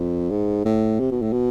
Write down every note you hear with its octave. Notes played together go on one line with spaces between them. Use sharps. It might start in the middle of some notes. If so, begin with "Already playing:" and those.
Already playing: F2
G#2
A2
C3
B2
A2
B2